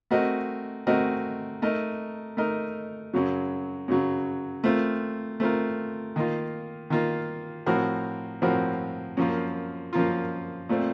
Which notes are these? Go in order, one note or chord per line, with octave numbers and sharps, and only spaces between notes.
A3 C4 F#4 A#4 D#5
A3 C4 F#4 A#4 D#5
A3 D#4 A#4 D#5
A3 D#4 A#4 D#5
F#2 C#3 F#3
F#2 C#3 F#3
A3 C4 F4 A#4
A3 C4 F4 A#4
D#3 A#3 F4
D#3 A#3 F4
A2 F3 C4 F#4 A#4
A2 F3 C4 F#4 A#4
F#2 F3 A#3 F4
F#2 F3 A#3 F4
A#2 A3 C4